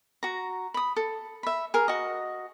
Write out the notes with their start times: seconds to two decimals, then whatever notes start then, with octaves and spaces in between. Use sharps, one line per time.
0.23 F#4 A#5
0.74 B5 D#6
0.96 A4
1.43 E5 B5
1.74 G#4 A#4
1.88 F#4 D#5